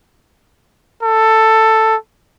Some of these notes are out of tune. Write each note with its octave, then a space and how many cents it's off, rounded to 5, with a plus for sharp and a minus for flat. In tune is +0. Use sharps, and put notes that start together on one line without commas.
A4 +10